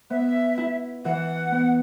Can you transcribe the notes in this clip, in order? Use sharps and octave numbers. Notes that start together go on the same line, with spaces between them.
B3 E5
E4
E3 F#5
B3